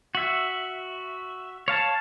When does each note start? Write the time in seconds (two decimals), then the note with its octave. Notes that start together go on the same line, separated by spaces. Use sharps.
0.15 F#4 E5
1.68 C#5 F5 A5